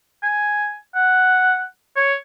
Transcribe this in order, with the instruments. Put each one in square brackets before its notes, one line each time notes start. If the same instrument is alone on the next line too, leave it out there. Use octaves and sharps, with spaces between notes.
[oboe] G#5
F#5
C#5